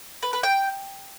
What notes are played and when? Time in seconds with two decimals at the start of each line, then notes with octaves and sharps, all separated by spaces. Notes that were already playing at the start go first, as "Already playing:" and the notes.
0.23 B4
0.33 B4
0.43 G5